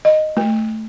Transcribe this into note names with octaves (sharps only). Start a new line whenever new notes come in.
D#5
A3